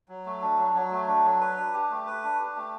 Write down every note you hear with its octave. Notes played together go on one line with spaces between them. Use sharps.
F#3
A3
D4
F#3
F#3
A3
D4
F#3
B4
D4
G4
A3
B4
D4
G4
A3